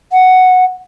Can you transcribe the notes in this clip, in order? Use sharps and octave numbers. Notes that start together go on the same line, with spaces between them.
F#5